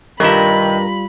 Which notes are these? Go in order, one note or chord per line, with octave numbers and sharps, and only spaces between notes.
G2 C3 D#3 G3 F4 A#4 B5